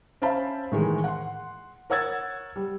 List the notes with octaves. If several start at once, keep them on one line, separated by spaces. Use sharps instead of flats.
C#4 C5 E5 F5 A5 B5
A2 D#3 E3 G#3
F#5 C6
A#4 C#5 F#5 E6 G#6 A6
G3